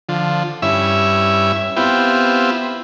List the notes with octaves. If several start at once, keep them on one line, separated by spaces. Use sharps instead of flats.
D3 F3
G2 C#4 E4 E5
B3 C4 E4 F4 G4